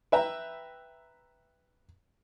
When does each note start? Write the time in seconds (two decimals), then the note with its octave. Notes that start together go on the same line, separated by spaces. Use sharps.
0.12 B4 E5 G5 A#5